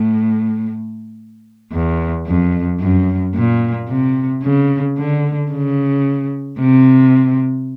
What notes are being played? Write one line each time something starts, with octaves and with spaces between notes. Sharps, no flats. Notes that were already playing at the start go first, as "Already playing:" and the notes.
Already playing: A2
E2
F2
F#2
A#2
C3
C#3
D3
C#3
C3